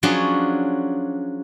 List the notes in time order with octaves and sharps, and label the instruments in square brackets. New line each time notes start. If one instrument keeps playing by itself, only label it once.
[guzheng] F3 F#3 C#4 D4 F#4 G#4